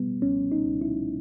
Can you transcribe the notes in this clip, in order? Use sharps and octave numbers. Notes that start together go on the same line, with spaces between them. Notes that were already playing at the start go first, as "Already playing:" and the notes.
Already playing: B2 G3 B3
C#2 C#4
D#4
C#2
E4